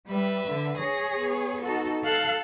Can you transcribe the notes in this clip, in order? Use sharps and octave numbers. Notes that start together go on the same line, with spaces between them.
G3 B4 E5
D3
G#4 C#5 A#6
B3
D#4 F#4 A4
A4 F5 F#6